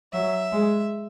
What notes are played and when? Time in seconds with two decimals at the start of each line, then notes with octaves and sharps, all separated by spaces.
0.12 F#3 E5
0.52 G#3